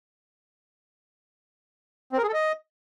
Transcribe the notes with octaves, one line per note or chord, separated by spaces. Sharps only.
C4
A#4
G#4
A4
D#5